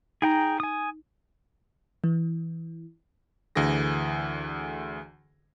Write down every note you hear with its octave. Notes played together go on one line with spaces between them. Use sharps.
D#4 G#4 G5 A#5
G#5 D#6
E3
D2 D3 E3 G#4 A#6